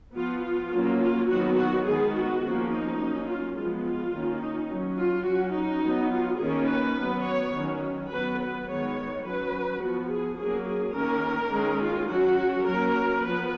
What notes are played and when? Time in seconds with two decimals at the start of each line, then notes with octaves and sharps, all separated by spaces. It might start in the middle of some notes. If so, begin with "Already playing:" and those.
0.16 F3 B3 F4
0.44 F4
0.73 F#3 A#3 C#4
1.01 F4
1.29 D#3 F#3 B3 F#4
1.57 F#4
1.85 D#3 G#3 B3 G#4
2.15 F#4
2.42 F3 A#3 C#4
2.72 D#4
3.00 F#3 A#3 C#4
3.28 F4
3.56 F3 G#3 B3 F4
3.84 F4
4.13 D#3 A#3 C#4
4.42 D#4
4.70 F#3 C#4
4.99 F4
5.27 F#3 C#4 F#4
5.55 D#4
5.84 F#3 B3
6.13 F4
6.40 D#3 A#3 C#4 G#4
6.69 B4
6.98 F#3 B3
7.25 C#5
7.54 D#3 F#3 C#4
8.11 F#3 B3 B4
8.39 B4
8.68 D#3 G#3 B3 C#5
9.25 F#3 C#4 B4
9.81 F3 B3 F#4
10.10 G#4
10.38 F#3 A#3 C#4 G#4
10.68 G#4
10.95 D#3 A#3 C#4 A#4
11.52 D#3 G#3 C#4
11.81 F4
12.09 F#3 C#4 F#4
12.66 F#3 A#3 C#4 A#4
13.23 F3 B3 B4